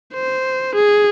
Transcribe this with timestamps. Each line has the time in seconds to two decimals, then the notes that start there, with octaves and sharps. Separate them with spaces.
0.14 C5
0.75 G#4